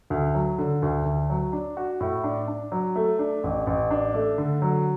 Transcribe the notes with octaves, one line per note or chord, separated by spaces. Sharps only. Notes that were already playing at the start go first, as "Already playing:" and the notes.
D2
F#3
D3
D2
D2
F#3
D4
F#4
A2
D4
D4
F#3
A3
D4
A1
A1
D4
A3
D3
F#3